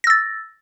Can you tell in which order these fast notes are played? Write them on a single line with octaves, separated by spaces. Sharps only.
A#6 E6 A6